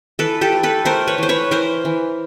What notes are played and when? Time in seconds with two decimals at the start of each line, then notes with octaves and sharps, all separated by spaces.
0.19 E3 A4 B4
0.41 G4 A4
0.53 A3
0.63 A4 B4
0.85 A3 A#4 C5
1.07 B4 C#5
1.18 E3 C5
1.29 B4 C#5
1.51 E3 A#4 C5
1.85 E3